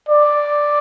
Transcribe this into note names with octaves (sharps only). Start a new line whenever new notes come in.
D5